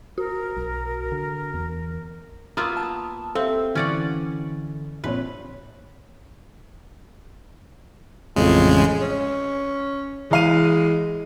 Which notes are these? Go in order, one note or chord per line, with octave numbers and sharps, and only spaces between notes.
F#4 A#4
B1
D3
E2
A#3 B3 F4 D#6 E6
A5
C4 G4 A4 E5 F5
D3 E3 C#4 D5 F#5
A#1 C4 B4 C#5
A1 F2 C#3 G#3
C#4
E3 G#3 F5 D#7